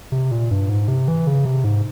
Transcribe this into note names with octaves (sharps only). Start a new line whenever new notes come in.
C3
A#2
G2
G#2
C3
E3
C#3
C3
G#2